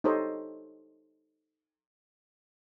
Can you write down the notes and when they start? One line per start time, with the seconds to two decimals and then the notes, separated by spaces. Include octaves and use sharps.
0.04 D#4 G4 A4 C5 C#5 D#5